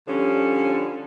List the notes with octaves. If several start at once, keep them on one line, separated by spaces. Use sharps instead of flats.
D3 F3 G3 C#4